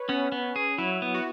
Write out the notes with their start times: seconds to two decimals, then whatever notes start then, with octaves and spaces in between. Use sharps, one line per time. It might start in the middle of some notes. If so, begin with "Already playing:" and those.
Already playing: B4 C#5
0.09 B3 C#4
0.32 B3
0.56 G#4
0.78 F#3 E4
1.02 B3
1.14 F#4